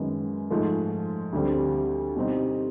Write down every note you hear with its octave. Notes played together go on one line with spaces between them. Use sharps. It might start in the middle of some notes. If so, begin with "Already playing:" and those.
Already playing: F#2 D#3 G#3 B3
G#2 F3 A3
D2 D3 G3 C4
B2 G3 C4 D#4